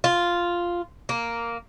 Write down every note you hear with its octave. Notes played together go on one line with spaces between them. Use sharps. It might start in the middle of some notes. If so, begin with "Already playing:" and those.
F4
A#3